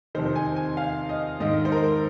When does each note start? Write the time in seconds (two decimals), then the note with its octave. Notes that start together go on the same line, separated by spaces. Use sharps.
0.15 F2 C3 D#3 C5
0.36 G#5
0.56 G#5
0.77 F5
1.09 D#5
1.40 G#2 D#3 D#5
1.65 C5
1.72 A#4